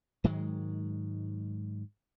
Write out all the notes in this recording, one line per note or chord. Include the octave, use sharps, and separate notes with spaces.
G#2 D#3 F#3 G#3